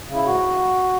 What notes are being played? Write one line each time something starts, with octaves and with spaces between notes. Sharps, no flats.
C#3
E4
G#2 F#4